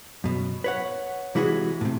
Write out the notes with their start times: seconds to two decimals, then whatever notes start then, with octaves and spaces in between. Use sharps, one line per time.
0.24 F#2 B2
0.64 B4 C#5 F#5
1.35 C3 E3 G#3 E4 F#4 G#4
1.81 A2 C3